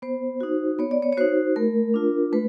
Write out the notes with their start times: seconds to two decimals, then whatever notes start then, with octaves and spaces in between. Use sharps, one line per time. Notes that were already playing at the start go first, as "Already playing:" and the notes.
0.02 B3 C5
0.41 D#4 F#4
0.79 B3 C#5
0.91 D5
1.02 C#5
1.13 C#5
1.17 D#4 F#4 C5
1.56 A3 A#4
1.94 D4 F4
2.33 A3 B4